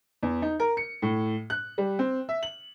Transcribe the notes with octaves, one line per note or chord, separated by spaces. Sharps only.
E2
D#4
A#4
C#7
A2
F#6
G3
C4
E5
F#7